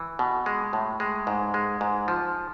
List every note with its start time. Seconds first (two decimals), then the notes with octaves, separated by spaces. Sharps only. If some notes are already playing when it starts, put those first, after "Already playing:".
Already playing: E3
0.19 B2
0.46 G#3
0.73 A2
1.00 G#3
1.27 G#2
1.54 G#3
1.81 G#2
2.08 F3